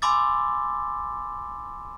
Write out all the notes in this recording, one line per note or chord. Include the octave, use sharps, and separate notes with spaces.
G#5 B5 C6 D6 E6 A6